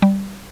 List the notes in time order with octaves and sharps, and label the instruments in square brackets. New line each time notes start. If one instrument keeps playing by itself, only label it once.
[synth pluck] G3